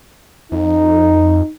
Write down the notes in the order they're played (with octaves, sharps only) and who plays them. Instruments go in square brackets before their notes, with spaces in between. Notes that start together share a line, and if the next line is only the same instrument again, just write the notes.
[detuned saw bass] F2 [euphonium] D#4